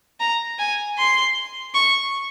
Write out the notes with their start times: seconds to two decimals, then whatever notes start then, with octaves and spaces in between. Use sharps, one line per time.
0.20 A#5
0.59 G#5
0.98 C6
1.74 C#6